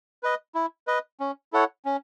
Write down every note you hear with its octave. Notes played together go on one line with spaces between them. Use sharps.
B4 D#5
E4
B4 D#5
C#4
E4 A4 C#5 F#5
C#4